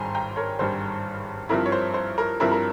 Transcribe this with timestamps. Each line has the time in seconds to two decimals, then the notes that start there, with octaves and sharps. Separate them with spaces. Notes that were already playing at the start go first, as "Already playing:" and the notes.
Already playing: G#1 G2 G3 G5 G#5 A#5 C6
0.15 G5 A#5
0.36 A#4 C#5
0.59 G#1 G2 G3 C5
1.49 G2 F3 C4 E4 A#4
1.66 C#5
1.72 C5
1.94 C5
2.18 A#4
2.40 G2 F3 C4 E4 A#4
2.52 A#4